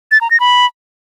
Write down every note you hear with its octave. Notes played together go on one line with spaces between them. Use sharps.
A6
A#5
A#6
B5